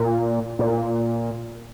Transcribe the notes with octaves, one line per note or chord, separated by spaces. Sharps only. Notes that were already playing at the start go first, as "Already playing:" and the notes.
Already playing: A#2
A#2